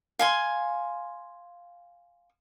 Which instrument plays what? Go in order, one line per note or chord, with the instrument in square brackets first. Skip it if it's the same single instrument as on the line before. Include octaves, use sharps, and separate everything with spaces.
[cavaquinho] F5 G#5 C6